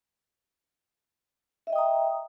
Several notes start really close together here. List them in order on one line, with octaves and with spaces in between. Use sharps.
E5 D#5 G5 D#6 A#5